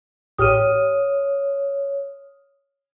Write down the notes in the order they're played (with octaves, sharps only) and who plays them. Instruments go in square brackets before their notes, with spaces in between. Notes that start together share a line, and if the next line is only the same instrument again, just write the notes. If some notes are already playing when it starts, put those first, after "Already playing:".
[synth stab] A1 G4 [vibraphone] C#5 [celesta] D#6 F6 D#7